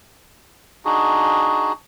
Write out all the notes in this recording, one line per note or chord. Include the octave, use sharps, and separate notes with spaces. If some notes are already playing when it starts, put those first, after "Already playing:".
D4 D#4 F#4 G#4